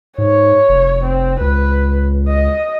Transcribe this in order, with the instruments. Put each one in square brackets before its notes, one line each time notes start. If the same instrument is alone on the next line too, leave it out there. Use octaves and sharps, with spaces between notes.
[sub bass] G#2 [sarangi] C#5
[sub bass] F1
[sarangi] C4
[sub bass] C#2 [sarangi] B4
[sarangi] D#5